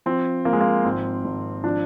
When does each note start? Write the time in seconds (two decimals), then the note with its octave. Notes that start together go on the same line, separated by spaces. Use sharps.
0.06 F3 C4
0.45 F3 A#3
0.53 G#3
0.61 A#3
0.85 G#1 C4
1.24 G#1
1.64 F3 D4